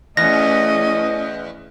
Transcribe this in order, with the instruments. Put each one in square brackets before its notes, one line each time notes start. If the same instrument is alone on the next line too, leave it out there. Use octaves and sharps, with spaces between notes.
[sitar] E2 [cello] A3 C#4 [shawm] D#5 [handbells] A#6